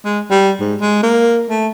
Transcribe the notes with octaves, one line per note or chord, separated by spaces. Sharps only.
G#3
G3
G#2
G#3
A#3
A3